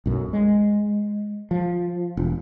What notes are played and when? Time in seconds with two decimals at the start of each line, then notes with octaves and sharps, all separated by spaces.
0.06 B1 F#2
0.33 G#3
1.51 F3
2.17 E1